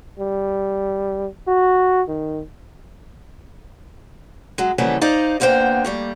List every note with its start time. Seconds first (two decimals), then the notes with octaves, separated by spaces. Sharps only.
0.19 G3
1.48 F#4
2.08 D#3
4.58 F#3 G#3
4.78 C#3 E3 F3 G3 A#3 B3
5.01 D#4 C5 D5 D#5 F5
5.40 E2 D3 A#3 B3 C5 G5
5.85 G3 A3 A#3